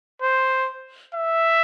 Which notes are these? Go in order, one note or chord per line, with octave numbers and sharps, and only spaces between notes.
C5
E5